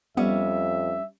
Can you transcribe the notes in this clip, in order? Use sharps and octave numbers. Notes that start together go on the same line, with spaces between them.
F2 G3 B3 C#4 E5